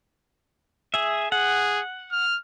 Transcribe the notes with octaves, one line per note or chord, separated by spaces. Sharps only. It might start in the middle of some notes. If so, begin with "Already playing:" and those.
G#4 E5
G#4 F#5
F6